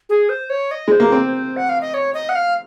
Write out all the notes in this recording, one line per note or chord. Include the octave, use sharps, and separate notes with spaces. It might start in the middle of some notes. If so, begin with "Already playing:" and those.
G#4
C5
C#5
D#5
G#3 C5
A#3
C4
F#5
F5
D#5
C#5
D#5
F#5
F5